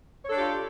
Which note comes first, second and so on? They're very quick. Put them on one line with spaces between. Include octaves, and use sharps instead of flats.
C#5 A4 D4 G4 F4